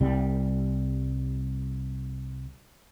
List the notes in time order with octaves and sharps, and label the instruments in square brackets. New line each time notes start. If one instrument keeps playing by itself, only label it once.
[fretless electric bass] C2 G3